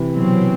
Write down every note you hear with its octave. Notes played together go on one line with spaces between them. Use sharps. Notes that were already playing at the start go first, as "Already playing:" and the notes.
Already playing: C3 E3
B2 F#3 C4